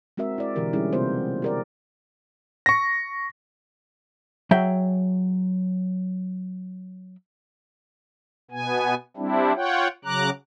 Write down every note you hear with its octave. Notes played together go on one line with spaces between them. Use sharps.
G#3 C4 F#4 A#4 E5
E4 D5
B2 D3 E3 G4 A#4
G3 G#3 C#4 D#4 E4 G#4
C3 A3 B3 C4 F4 C5
G4 A#4 D5
C#6 A#6
F#3 G#4 E5 G5
B2 B3 G#5
G3 C4 D4 E4
F4 C#5 F#5 G5
C#3 F#3 A#5 D6 F#6